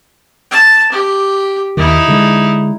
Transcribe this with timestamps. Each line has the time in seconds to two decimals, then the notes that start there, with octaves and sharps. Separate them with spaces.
0.51 A5
0.92 G4
1.77 D#2 D#3 D#4 E4
2.08 D3 G#3